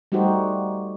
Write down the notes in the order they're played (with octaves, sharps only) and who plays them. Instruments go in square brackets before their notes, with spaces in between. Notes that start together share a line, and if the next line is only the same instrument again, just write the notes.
[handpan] G3 A3 D#4 F#4 G4 C5